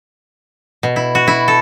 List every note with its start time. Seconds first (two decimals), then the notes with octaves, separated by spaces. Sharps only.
0.83 B2
0.96 E4
1.15 F#4
1.27 E4
1.48 A4